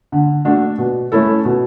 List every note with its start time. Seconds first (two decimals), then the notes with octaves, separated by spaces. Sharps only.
0.12 D3
0.45 A3 D4 F#4
0.78 B2
1.12 A3 C#4 E4 A4
1.45 B2